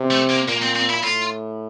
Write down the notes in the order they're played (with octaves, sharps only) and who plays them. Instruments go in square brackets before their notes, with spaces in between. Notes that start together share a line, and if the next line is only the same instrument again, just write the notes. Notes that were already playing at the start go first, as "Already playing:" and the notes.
Already playing: [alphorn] C3
[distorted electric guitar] A3
A#3
[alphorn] A#2 [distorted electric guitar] A#3
[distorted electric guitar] C4
C4
E4
[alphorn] A2 [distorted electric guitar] F4